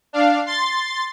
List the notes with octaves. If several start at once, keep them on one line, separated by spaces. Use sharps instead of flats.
D4 F5
C6 A6